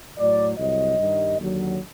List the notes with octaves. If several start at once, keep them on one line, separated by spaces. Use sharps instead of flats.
A2 F#3 D5
C2 C3 F#3 D#5
G2 D#3 G3
D#2 D3 F#3